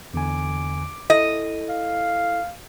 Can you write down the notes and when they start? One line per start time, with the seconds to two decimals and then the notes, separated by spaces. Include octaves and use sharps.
0.14 E2 D3 G#5 D6
1.10 E4 A4 D#5
1.69 F5